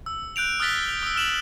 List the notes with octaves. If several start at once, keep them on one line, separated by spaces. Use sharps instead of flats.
E6
F#6 G6 D7 F7
D#6 F6 F#6 A6 B6 G7
D#6 E6
E6 F6 E7 F#7